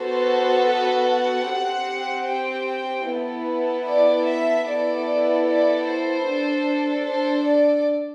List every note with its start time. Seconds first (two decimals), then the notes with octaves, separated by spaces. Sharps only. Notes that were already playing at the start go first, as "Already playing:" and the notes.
Already playing: B3 F#4 A4 C5
0.69 B4
1.08 F#5
1.48 C4 G4
2.28 G5
2.68 G5
3.08 B3 E4 A4
3.88 D5
4.27 E5
4.67 B3 E4 A4 D5
5.47 D5
5.87 C5
6.27 D4 A4
7.07 C5
7.46 D5